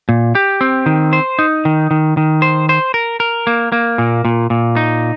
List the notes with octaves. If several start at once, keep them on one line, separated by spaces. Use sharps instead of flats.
A#2
G4
C4
D#3
C5
D#4
D#3
D#3
D#3
C5
C5
A#4
A#4
A#3
A#3
A#2
A#2
A#2
D#4